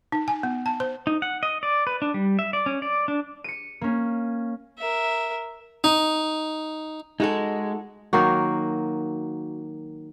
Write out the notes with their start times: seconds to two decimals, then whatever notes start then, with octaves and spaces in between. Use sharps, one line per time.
0.12 D#4
0.28 G#5
0.43 B3
0.66 A5
0.80 C5
1.07 D#4
1.22 F#5
1.43 D#5
1.63 D5
1.87 B4
2.02 D4
2.14 G3
2.39 E5
2.53 D5
2.66 C#4
2.82 D5
3.08 D4
3.44 C#7 D#7
3.81 A#3 C#4
4.78 A#4 E5
5.84 D#4
7.20 G#3 D#4 F#4 A4
8.13 D#3 F#3 A#3 F#4